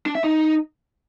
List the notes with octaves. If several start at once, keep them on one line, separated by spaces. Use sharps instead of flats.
D4
E5
D#4